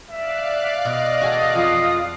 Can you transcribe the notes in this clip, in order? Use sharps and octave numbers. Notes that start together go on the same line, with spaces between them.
D5 E5 F5 F#6
B2 D#5
F#4 G#4 A4
F2 F4 D#6